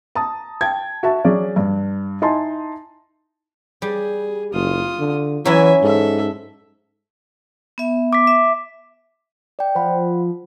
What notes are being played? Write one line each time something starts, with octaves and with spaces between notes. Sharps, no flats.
A5 A#5 D#6
G5 A5 G#6
F#4 E5 A5
F#3 C#4 G#4 D5
G2
D#4 E4 G#5 A5 C6
G3 G#4
F#1 F4 D#6
D3
E3 F#3 C#4 E4 E5 G#5
G#2 A4 E5
B3 E5
D6 B6
E5
D5 G5
F3 C5 F#5 B5